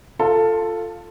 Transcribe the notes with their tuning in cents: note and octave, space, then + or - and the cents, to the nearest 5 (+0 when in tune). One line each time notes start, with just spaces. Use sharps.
F4 +0 A4 +10